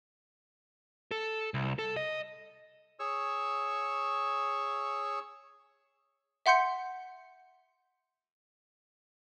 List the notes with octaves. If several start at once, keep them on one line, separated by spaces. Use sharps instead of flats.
A4
C2
A4
D#5
G#4 C#5 C#6 E6
E5 F#5 C6 G6 C#7